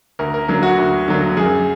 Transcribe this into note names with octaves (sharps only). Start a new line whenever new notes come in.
D2 A#4
A#4
D3 F#3 A#3 A#4
F#4
D2
D3 F#3 A#3
F#2 G#4